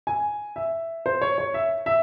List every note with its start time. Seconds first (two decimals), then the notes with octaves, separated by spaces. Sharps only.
0.07 G#5
0.56 E5
1.06 C5
1.22 C#5
1.38 C#5
1.54 E5
1.86 E5